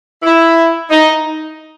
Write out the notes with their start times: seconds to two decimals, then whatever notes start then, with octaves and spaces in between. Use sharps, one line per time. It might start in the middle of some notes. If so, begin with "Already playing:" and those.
0.23 E4
0.89 D#4